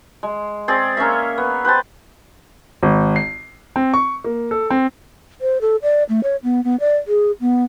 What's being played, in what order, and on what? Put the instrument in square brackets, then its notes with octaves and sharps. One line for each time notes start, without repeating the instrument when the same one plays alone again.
[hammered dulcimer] G#3
C4 G#4 D5
A#3 C#4 C#5 E5
B3
B4 C5 G5 A5
[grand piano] G#1
C7
C4
C#6
A#3
A4
C4
[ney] C5
A4
D5
A3
C#5
B3
B3
D5
G#4
B3